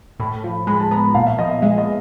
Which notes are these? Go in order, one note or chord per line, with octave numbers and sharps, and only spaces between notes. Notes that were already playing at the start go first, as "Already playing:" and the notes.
A2 B5
F3
G#3 B5
A5
B3 A#5
A#2 F5
E5
F3 D#5
E5
G#3 E5
D#5